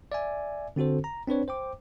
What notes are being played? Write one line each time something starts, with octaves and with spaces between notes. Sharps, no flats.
D5 E5 G#5
D3 C4 F#4 A4 C5
A#5
C4 D4 B4 C#5
C5 G5 D6